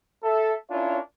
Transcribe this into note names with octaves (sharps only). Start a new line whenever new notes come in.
A4 E5
C#4 D4 E4 F4 A#4 C#5